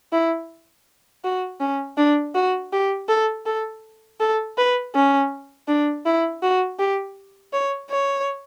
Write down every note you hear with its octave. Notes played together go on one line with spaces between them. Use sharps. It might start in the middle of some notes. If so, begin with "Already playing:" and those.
E4
F#4
C#4
D4
F#4
G4
A4
A4
A4
B4
C#4
D4
E4
F#4
G4
C#5
C#5